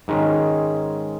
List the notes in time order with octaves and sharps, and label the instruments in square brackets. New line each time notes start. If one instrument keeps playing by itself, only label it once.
[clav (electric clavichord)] G#2 D#3 G#3 C#4